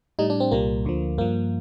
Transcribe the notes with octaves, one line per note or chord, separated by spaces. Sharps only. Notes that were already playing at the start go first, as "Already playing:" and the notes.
A2 G3 D#4
D4
C4
C2 A#2 G3 A#3
D2 D3 F3
G2 F3 A#3